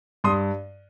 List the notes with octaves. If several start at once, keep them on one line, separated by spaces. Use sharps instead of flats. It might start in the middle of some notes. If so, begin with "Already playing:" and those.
G2 C6 D#6